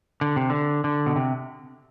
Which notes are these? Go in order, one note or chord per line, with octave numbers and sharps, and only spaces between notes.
D3
C3
D3
D3
B2
C3